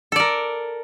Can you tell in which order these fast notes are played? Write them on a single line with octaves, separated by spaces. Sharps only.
A4 D5 A#4